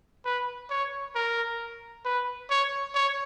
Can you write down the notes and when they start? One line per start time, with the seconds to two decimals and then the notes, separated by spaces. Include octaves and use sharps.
0.25 B4
0.70 C#5
1.15 A#4
2.05 B4
2.50 C#5
2.95 C#5